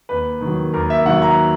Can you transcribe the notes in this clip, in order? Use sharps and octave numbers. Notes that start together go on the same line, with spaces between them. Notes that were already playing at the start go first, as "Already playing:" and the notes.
D#2 B4
D#3
F#3
D#2 A#4
E5
D#3 F#3 F#5
A#5